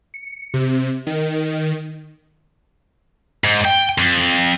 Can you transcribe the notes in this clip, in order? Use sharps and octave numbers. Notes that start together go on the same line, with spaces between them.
C#7
C3
D#3
G#2
G5
F2